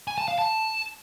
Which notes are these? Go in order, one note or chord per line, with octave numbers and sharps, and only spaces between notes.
G#5
A5
F5
A5